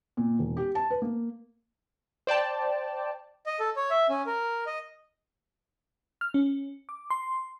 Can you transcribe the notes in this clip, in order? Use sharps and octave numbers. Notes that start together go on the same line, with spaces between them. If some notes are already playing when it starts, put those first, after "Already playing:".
A#2
E1
G4
A5
B4
A#3
C5 D5 G5 A5
D#5
A4
C#5
E5
C#4
A#4
D#5
F6
C#4
D6
C6